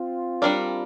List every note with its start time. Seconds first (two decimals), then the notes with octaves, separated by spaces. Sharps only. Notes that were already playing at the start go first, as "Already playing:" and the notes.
Already playing: C4 F4
0.42 G3 D4 A#4 D5